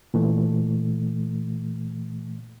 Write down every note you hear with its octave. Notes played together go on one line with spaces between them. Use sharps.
A#2 E3 A3